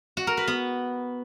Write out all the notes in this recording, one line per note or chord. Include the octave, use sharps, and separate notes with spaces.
F#4
A#4
B4
B3